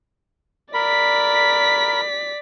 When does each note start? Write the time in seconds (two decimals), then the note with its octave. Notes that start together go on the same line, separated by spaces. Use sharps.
0.74 A#4 D5 B5 B6